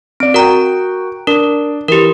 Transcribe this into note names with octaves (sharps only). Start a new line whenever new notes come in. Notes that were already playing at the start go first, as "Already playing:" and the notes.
C4 D5 D7
F#4 A#4 G5 A#5
D4 A#4
E3 G4 A#4